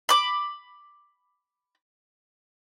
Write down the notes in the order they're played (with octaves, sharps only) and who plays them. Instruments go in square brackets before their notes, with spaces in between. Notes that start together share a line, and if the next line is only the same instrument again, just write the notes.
[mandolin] B5 D6